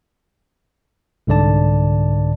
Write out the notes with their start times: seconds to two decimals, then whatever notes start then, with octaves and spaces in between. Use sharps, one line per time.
1.27 C2 G#2 D3 D5 A5